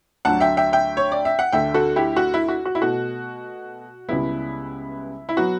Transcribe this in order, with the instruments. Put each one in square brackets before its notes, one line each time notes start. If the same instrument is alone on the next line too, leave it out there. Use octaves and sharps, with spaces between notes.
[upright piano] D2 D3 F#3 F#5 A5
E5 G5
E5 G5
E5 G5
C#5
D5
E5
F#5
D2 D3 A3 E5 G5
F#4 A4
E4 G4
F#4
E4
F#4
F#4
E4
B2 A3 F#4
C#2 C#3 G3 B3 E4
E4
F#3 B3 F#4